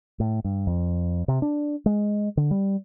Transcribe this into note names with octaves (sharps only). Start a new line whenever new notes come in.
A2
G2
F2
C3
D4
G#3
D3
G3